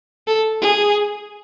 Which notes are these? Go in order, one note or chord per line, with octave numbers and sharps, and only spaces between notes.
A4
G#4